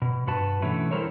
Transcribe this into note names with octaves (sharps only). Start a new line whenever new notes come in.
B2
G2 F#4 B4 A5
B2 D3 E3 A3 C#4 E4
G3 E4 A4 A#4 C5 C#5